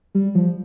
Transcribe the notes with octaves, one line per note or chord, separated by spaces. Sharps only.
G3
F3